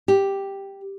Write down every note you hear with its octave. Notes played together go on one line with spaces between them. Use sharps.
G4